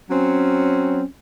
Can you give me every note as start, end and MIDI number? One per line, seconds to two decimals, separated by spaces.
0.10 1.03 54
0.10 1.03 60
0.10 1.03 61